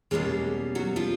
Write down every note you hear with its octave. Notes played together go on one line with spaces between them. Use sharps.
E2 B2 G3 G#3 A#3 C#4 G#4
F#3 F#4
F3 F4